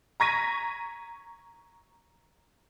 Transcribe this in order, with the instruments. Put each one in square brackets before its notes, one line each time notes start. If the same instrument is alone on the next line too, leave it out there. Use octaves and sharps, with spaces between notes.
[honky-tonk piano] A#5 C#6 G#6 A#6 B6 D#7